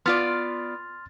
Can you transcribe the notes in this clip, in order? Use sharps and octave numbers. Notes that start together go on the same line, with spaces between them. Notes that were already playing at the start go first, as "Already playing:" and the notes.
B3 F4 D5 C6 F6 A6